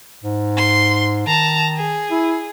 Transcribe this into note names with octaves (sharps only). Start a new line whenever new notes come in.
G#2
C6
D#3 A5 A#5
G#4
E4